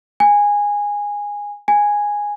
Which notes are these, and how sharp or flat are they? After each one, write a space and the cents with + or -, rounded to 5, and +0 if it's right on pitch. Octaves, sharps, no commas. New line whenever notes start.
G#5 -15
G#5 -5